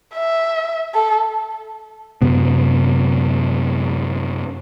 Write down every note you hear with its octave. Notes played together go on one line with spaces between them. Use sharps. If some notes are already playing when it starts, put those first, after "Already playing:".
E5
A4
F#2 C3 B3